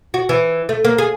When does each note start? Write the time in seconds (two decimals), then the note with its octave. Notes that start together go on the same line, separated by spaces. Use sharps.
0.14 F#4
0.29 E3
0.69 A3
0.84 A#3
0.98 G#4